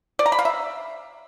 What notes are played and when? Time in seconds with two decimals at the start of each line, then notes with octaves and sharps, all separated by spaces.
0.19 D5
0.26 A#5
0.32 B5
0.39 F5
0.45 E5